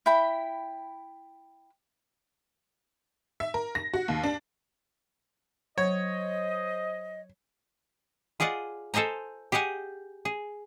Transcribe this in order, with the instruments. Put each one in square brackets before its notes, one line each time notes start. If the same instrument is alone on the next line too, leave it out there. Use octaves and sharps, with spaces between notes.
[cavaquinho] E4 G5 B5
[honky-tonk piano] E5
A#4
A#6
F#4
D#2
D4
[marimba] F#3 [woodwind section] C5 D#5 [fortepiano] C#5
[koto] F4 G#4 D5 D#5 F#5
A4 C5 D#5 G#5 A#5
G4 G#4 D#5 F#5 G#5
G#4